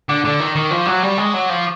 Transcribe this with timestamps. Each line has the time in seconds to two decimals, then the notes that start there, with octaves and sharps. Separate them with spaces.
0.09 D3 D6
0.25 D3 D6
0.40 D#3
0.55 D#3 C#6
0.71 F3
0.86 F#3 D6
1.03 G3
1.18 G#3
1.33 F#3
1.49 F3